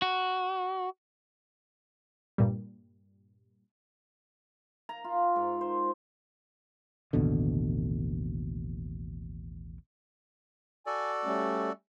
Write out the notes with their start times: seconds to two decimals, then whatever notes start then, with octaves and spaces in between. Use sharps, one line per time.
0.02 F#4
2.38 G2 A#2 G3
4.89 A#5
5.04 F4
5.36 G#2
5.61 C5
7.13 A1 D#2 B2 D3
10.86 F#4 A4 D5 G#5
11.24 G3 A3 C#4